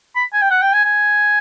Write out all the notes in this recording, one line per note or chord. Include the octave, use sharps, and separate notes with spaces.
B5
G#5
G5
F#5
G5
G#5
G#5